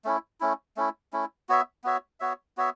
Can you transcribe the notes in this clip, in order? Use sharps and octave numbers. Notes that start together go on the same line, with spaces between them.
A3 C#4 E4
A3 C#4 E4
A3 C#4 E4
A3 C#4 E4
B3 F#4 C#5 E5
B3 F#4 C#5 E5
B3 F#4 C#5 E5
B3 F#4 C#5 E5